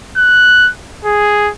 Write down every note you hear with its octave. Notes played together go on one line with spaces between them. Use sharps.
F#6
G#4